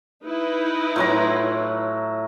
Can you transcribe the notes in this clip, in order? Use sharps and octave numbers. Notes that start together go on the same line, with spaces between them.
D#4 E4 B4
A2 F#3 F4 A#5